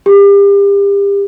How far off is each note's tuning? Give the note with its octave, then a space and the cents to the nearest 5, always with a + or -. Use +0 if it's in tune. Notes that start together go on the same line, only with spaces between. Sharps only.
G4 +35